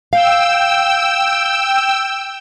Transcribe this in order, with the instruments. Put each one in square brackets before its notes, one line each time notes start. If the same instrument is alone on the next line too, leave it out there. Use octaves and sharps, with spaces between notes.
[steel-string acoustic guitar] F5 [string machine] G5 E6